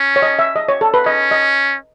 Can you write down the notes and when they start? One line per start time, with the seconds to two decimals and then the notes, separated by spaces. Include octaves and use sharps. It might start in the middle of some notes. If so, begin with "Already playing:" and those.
Already playing: C#4
0.16 C#5
0.22 D#5
0.39 E5
0.56 D#5
0.69 C#5
0.81 A4
0.94 B4
1.06 C#4 D#5
1.31 D#5